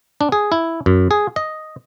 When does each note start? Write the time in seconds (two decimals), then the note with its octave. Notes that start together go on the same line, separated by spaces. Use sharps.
0.21 D4
0.32 G#4
0.52 E4
0.86 F#2
1.11 G#4
1.36 D#5